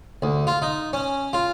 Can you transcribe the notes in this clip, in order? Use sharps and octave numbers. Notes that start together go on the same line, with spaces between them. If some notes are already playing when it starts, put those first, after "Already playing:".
D2
F4
D#4
C#4
F4